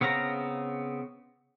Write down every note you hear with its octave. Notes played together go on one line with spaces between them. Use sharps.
C#3 B3 C4 F5 A#5